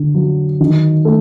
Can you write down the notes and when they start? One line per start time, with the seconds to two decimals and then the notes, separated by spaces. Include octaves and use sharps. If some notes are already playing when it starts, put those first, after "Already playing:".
Already playing: D3
0.15 F#3
0.60 D#3
1.05 A3